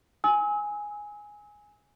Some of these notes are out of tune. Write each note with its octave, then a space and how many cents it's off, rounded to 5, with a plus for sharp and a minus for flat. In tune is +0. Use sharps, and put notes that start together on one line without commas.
G#5 +0 E6 -40